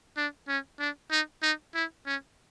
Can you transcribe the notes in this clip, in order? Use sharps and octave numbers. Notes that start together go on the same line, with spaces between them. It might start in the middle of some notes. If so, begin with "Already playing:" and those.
D4
C#4
D4
D#4
D#4
E4
C#4